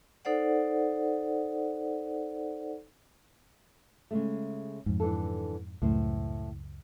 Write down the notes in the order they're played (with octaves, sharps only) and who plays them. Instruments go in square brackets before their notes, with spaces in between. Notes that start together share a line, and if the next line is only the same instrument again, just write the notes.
[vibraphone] D#4 A4 C5 D5 F#5
[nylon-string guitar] C#3 G#3 A3
[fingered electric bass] F2 G#2
[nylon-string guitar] D3 E3 A4
[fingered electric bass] C#2 F#2 [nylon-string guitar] A2 C5